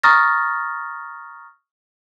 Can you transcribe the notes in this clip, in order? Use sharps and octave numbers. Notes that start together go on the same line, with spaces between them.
A#5 C#6 D#6 F6 A6 A#6